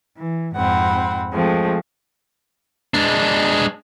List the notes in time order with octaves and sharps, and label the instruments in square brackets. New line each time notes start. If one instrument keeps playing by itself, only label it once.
[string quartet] E3
F2 G#2 C4 F#5 B5
F3 G#3 A3 C4
[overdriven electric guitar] G#3 D4